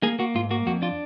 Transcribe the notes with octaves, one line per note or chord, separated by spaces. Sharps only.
A#3 G#4
A#3 F#4
G#2 F4
A#3 F#4
F2 F#4
D4 F4